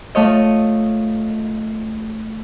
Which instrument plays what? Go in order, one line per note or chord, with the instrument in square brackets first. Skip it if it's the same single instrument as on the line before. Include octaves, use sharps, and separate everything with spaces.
[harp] A3 F4 C#5 D#5